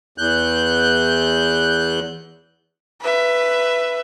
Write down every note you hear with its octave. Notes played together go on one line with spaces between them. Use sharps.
E2 F#6 G6
B4 E5